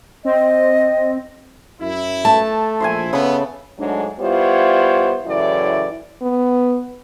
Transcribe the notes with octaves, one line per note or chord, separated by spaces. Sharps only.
C4 D#5
F#2 E4
A3 A5
A#1 E4 C5 E5 G#5
C#3 B3 A4 B5
G#2 F#3 G#3 A3 D4
G3 B3 E4 F4 C5 C#5
F#2 A2 C#3 E3 E4 D5
B3